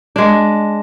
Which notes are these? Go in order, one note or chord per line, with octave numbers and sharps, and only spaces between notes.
G#3 D4